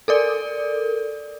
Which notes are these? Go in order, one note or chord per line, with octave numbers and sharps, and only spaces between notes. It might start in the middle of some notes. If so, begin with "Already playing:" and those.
A4 A#4 D5